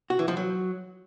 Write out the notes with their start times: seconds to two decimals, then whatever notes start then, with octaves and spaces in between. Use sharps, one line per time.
0.10 F#4
0.19 E3
0.28 F3
0.37 F#3